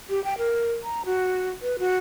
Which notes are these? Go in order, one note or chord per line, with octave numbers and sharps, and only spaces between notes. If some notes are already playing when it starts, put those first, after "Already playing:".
G4
G5
A#4
A#5
F#4
B4
F#4